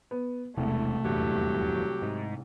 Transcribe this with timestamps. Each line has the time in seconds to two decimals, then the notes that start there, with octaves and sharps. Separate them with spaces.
0.11 B3
0.57 E1 C2 A3
1.04 D#1 E2 G2 F#3 G4
2.02 G#2